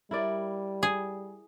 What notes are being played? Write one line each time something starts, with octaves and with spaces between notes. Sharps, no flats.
G3 E4 A#4 D5
G#4